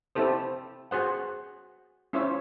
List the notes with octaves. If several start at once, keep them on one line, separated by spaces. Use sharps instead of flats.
C4 E4 G4 A4 C5
F#4 G#4 C5 F#5
C#4 E4 F4 C5 C#5 E5